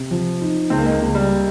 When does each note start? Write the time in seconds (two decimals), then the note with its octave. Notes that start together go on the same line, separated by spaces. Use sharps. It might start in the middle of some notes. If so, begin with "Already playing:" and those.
Already playing: C3
0.11 F3
0.42 D#4
0.70 C#2 C4
0.79 A#3
0.85 G#3
0.92 A#3
1.00 C#2
1.15 G3